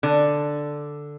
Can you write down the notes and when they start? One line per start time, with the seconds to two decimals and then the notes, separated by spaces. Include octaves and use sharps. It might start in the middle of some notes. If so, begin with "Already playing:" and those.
0.03 D3